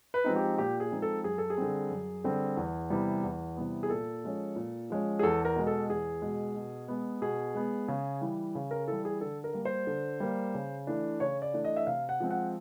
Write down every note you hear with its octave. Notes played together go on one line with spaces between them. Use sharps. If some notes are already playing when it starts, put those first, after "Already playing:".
B4
F3 G#3 C4 D#4
G4
A#2 G4
G#4
F3 G#3 C4 D#4
A4
F#2 G#4
A4
G#4
D3 G3 C4
F#2
D3 G3 C4
E2
C3 E3 G3 B3
E2
C3 E3 G3 B3
G#4
A#2 A4
F3 G#3 C#4
A#2
F3 G#3 C#4
G#4
E2 A4
A#4
B2 G#3
A4
E2 G#4
B2 G#3
B2
G#3 B3
B2 G#4
G#3 B3
C#3
E3 G3
C#3
A#4
E3 G3 A4
G#4
D3 A4
A#4
G3 A#3
C5
D3
G3 A#3
C#3
E3 A3 D4
C#3 C#5
D5
E3 A3 D4
D#5
E5
C3 F5
F#5
F3 G#3 C4
F#5